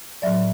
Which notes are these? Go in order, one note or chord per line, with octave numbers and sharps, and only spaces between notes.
A2 F#3 D5 E5